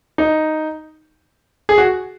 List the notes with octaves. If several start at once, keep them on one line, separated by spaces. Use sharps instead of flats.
D#4
G#4
F#4